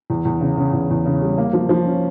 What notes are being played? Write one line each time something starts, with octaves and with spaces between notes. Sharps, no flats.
E2
E2
C#3
C#3
E2
E2
C#3
G3
A#3
F3
F3
C#4